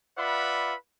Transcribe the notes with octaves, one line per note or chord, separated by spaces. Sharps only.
F4 B4 D5 E5 F#5 B5